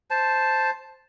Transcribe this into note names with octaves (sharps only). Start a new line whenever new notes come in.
C5 A5